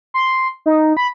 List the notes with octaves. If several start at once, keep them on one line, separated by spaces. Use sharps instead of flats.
C6
D#4
B5